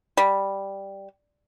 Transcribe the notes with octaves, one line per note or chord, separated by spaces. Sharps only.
G3